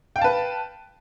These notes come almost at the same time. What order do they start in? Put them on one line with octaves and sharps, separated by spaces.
G5 F5 A5 B4